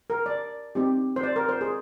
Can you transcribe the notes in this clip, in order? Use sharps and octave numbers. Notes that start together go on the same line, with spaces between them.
A#4
D5
C4 D#4 G4
C5
D5
A#4
C5
G#4